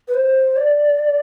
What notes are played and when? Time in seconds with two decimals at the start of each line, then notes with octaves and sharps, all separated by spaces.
0.08 B4
0.14 C5
0.56 D5